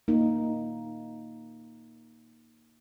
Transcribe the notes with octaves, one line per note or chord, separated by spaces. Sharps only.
A#3 D#4